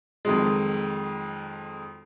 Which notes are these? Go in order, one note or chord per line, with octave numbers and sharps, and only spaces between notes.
F2 D#3 F#3 G#3